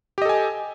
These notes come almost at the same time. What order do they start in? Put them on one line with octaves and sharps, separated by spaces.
G4 D#5 A4 G#5